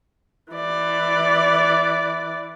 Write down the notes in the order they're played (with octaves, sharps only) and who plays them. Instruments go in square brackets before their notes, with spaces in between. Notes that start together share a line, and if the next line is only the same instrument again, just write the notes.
[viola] E3 D5